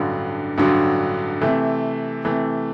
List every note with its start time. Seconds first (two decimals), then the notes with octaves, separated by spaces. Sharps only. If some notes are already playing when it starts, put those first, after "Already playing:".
Already playing: A1 G2 D3 F#3
0.58 A1 G2 D3 F#3
1.41 C3 E3 A3
2.25 C3 E3 A3